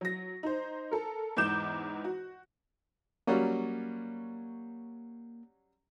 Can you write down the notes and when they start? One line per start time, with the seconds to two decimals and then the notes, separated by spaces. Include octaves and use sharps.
0.01 F#3 A#6
0.43 D#4 C5
0.91 A4 A#4
1.37 E2 G#2 E3 D6 G6 E7
2.04 F#4
3.27 F#3 G3 A#3 C#4